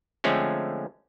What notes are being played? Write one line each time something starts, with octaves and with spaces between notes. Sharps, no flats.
D3 F3 G#3 A3 C4 C#4